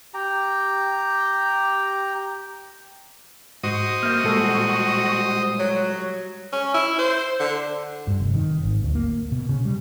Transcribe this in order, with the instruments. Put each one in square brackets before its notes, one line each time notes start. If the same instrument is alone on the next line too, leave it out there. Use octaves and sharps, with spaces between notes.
[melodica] G4 G5 A#5
[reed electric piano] G#2 [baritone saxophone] F#4 [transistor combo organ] C5 D#5 D#6
[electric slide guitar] A#3 A#4 E5 [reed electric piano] F6 G6
[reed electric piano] A#2 A4 E6 [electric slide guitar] G3 G#3 F4
[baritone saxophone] F#3 [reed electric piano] C#5
[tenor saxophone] C#4
E4
C5
D3
[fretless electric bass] G2
F1
D#3
G#1
D2
A#3
B2
C#3
G3